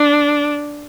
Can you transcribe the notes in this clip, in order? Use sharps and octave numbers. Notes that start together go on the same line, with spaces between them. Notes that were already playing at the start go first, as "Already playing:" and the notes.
Already playing: D4